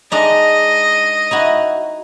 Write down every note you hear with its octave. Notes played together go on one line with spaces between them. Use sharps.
G#3 D4 D#4 D#5
D#4 E4 F#4